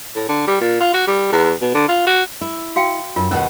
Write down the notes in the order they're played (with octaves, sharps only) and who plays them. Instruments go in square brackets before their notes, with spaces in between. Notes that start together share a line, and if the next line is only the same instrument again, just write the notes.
[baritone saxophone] A2
D3
G3
A#2
F4
F#4
G3
E2
B2
D3
F4
F#4
[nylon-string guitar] E4
[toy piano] F#4 F5 G5
[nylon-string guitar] F#2 [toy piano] F4
[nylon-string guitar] D#2 B2 F#5 [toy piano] C#4